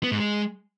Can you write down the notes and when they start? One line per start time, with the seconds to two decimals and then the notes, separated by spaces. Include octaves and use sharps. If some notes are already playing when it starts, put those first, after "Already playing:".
0.04 B3
0.12 G#2
0.20 G#3